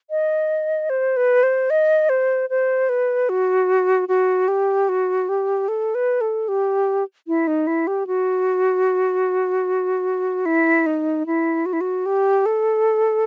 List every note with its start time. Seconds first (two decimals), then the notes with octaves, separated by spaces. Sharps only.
0.10 D#5
0.90 C5
1.17 B4
1.43 C5
1.70 D#5
2.09 C5
2.50 C5
2.89 B4
3.29 F#4
4.09 F#4
4.48 G4
4.89 F#4
5.29 G4
5.68 A4
5.95 B4
6.21 A4
6.48 G4
7.28 E4
7.47 D#4
7.67 E4
7.87 G4
8.07 F#4
10.46 E4
10.86 D#4
11.26 E4
11.66 F#4
11.73 E4
11.81 F#4
12.06 G4
12.46 A4